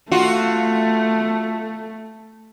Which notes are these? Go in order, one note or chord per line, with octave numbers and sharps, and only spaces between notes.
A3 F4 F#4